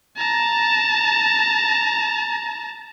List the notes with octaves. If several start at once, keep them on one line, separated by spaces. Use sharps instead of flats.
A5 A#5